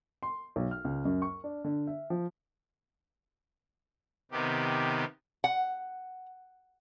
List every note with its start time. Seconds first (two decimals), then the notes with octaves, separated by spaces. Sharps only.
0.23 C6
0.56 B1
0.71 F6
0.85 C#2
1.05 F#2
1.22 C#6
1.44 D4
1.64 D3
1.87 E5
2.10 F3
4.31 C3 D#3 B3 G4
5.44 F#5